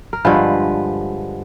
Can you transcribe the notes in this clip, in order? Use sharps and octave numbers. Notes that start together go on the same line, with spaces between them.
A#4
G2 D3 F3 G#3 B4